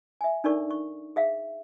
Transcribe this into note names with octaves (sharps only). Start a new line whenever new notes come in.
E5 G#5
D4 D#4 A4 A#4 D5 C#6
C#6
G#4 E5 F5